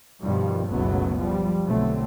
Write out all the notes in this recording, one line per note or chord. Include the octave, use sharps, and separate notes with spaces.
G2 B2 D#3 F3 G3
F#1 C#2 B2 F#3 A3 B3
F3 G3
B1 D3 A3 C4